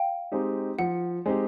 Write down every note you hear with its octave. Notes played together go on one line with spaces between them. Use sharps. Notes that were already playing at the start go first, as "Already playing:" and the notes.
Already playing: F5 G5
G#3 C4 D#4 G4
F3 F#5
G#3 C4 D#4 G4